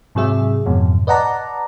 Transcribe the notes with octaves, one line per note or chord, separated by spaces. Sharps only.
G#2 C3 F#3 G#4 E5
F2 G#2 B2 E3
B4 D5 D#5 F#5 A5 A#5